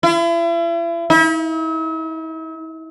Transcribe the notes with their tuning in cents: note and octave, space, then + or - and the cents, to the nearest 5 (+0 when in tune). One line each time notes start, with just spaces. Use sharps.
E4 +40
E4 -45